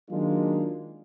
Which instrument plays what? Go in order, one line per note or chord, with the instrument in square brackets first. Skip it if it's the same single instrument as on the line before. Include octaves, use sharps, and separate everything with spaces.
[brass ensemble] D#3 F#3 G#3 A#3 D4 F4